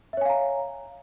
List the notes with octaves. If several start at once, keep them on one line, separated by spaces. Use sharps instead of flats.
C#5 E5 F5 G#5 A#5